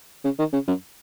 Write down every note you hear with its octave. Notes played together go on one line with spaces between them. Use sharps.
C#3
D#3
C#3
F#2